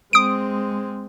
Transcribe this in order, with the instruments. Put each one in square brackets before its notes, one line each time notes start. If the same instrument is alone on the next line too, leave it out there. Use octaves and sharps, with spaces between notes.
[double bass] G#3 C4 [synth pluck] D#6 D7